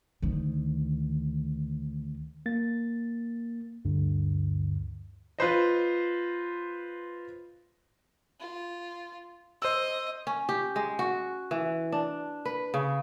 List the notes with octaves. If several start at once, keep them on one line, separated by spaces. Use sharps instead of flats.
D2 D#3
A#3 A6
D2 G2 D3
F4 B4 C5 D#5
F4
C5 D#5 E6
C#4
G4
G#3
F#4
E3
D4
B4
C#3